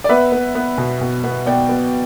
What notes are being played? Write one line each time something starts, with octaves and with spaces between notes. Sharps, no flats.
D5
B3 B4 E5
B3
B3
B2
B2
B3
B3 D5 G5
B3